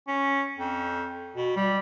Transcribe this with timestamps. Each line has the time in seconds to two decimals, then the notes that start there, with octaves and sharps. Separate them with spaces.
0.07 C#4
0.58 F2
1.36 B2
1.56 G3